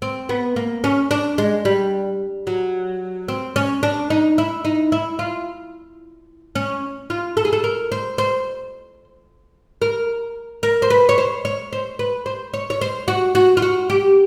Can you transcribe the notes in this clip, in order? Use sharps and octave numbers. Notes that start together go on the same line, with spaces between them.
C4
B3
A#3
C#4
D4
G#3
G3
F#3
C4
C#4
D4
D#4
E4
D#4
E4
F4
C#4
F4
A4
G#4
A4
A#4
C5
C5
A#4
A#4
C5
B4
C#5
C5
C#5
C5
B4
C5
C#5
C#5
C5
F#4
F#4
F4
F#4
G4